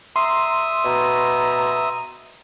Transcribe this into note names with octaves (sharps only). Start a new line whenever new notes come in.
E5 A#5 C6 D#6
B2 A#5